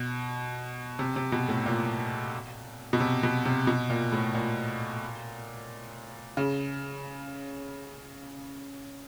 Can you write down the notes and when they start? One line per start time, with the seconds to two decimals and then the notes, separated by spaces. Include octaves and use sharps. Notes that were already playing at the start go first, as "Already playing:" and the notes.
Already playing: B2
0.99 C3
1.16 C3
1.32 B2
1.49 A2
1.66 A#2
2.93 B2
3.00 C3
3.23 B2
3.45 C3
3.67 B2
3.90 A#2
4.12 A2
4.34 A#2
6.37 C#3